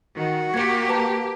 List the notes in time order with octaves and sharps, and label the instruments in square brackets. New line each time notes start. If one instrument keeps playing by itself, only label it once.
[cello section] D#3 [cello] F#4
[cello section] A#3 G4 [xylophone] G#6 C#7
[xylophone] B4 A5 A#5